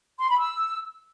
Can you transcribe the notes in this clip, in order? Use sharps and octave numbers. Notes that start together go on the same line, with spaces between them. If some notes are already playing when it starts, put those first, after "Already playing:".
C6
B5
E6